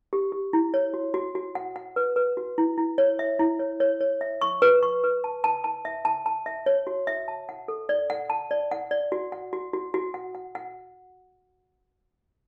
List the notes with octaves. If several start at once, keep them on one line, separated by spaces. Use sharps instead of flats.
G4
G4
E4
C#5
F#4
F#4
F#4
F#5
F#5
B4
B4
F#4
E4
E4
C#5
E5
E4
C#5
C#5
C#5
E5
C#6
B4
C#6
B4
A5
A5
A5
E5
A5
A5
E5
C#5
F#4
E5
A5
F#5
A4
D5
F#5
A5
D5
F#5
D5
F#4
F#5
F#4
F#4
F#4
F#5
F#5
F#5